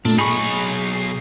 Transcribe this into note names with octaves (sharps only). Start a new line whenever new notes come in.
A#2 A3 D4
B1 D#4 G#4 B5 C#6 C7